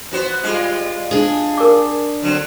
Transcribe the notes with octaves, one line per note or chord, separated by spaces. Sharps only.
B3 F#4 C5
G3 G#3 F4
D4 G#4
A#4 D6
D3 F#3 C4